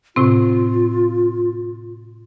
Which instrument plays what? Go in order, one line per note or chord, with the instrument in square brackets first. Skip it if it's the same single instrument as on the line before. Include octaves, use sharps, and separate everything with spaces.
[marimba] A2 C3 C4 [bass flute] F4